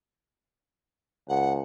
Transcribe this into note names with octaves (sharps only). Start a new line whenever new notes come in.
C#2 F#5